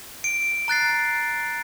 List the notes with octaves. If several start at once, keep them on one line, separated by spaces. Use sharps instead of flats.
D7
A#5 F#6 A6 C7